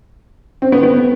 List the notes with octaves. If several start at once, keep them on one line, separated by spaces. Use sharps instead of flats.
C4
B3
B3